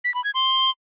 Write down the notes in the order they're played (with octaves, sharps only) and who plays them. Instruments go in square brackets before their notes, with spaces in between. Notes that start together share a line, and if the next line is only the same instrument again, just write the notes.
[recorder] B6
B5
G#6
C6